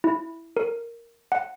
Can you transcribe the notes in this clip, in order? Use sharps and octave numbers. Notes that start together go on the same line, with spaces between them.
E4
A#4
F#5